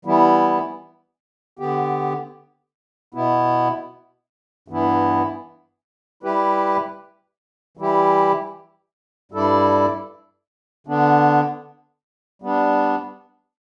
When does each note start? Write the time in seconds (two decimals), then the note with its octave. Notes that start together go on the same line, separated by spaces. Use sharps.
0.05 E3 G3 B3 E4
1.59 D3 B3 G4
3.14 B2 B3 E4
4.68 G2 E3 B3 E4
6.23 G3 E4 G4 B4
7.77 E3 G3 E4 G4
9.32 G2 G3 E4 A4 D5
10.87 D3 B3 D4
12.42 G3 B3 D4